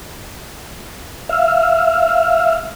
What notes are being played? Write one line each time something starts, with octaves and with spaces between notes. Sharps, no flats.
E5 F5